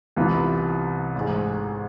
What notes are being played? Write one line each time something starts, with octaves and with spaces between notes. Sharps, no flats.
C2 C3 E3 B3 F4
A1 G#2 G#3